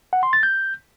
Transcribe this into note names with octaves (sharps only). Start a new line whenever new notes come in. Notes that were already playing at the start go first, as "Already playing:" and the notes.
F#5
C6
A6
G6